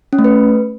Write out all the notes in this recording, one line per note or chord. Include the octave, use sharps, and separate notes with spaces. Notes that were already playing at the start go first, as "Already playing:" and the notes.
C#4
A3
B4